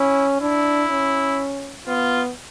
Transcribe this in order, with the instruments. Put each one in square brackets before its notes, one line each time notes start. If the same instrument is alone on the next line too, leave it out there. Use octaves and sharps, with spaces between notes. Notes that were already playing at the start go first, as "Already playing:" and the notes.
Already playing: [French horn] C#4 [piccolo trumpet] E4
[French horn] D4 [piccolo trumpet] E4
[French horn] C#4
[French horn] B3 [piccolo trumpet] F4